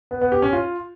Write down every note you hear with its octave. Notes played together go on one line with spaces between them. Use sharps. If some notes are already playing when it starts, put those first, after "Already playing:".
B3
B3
G4
C#4
F4